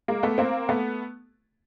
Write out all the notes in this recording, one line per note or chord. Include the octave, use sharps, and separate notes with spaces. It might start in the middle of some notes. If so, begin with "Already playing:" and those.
G#3 A#3
A3 B3
A#3 C4
A3 B3